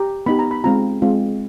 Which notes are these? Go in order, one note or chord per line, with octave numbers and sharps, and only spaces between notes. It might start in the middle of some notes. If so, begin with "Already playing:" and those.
Already playing: G4 A#5
B3 D#4 G4 B5
A#5
B5
G#3 C4 F4 A#5
G#3 C4 F4